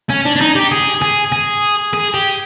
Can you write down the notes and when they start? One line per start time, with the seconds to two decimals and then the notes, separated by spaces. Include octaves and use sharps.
0.10 C#4
0.25 D4
0.36 D4
0.41 D#4
0.56 G4
0.72 G#4
1.02 G#4
1.32 G#4
1.94 G#4
2.14 G4